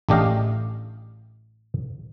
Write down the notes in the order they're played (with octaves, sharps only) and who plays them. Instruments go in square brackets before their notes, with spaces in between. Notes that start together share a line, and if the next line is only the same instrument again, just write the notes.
[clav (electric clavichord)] A1 A3 D4 G4 D#5 F5